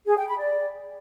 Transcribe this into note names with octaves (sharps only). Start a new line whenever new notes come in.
G#4
G5
B5
D5